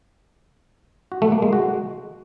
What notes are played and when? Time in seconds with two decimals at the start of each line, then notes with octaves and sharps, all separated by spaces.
1.12 F#4
1.22 A3
1.32 A#3
1.42 G#3
1.53 F#4